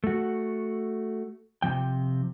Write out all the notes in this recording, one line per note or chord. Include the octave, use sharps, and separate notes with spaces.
A3 F#4
C3 F3 G5